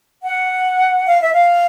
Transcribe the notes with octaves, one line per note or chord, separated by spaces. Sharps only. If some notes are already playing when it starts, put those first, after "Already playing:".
F#5
F5
E5
F5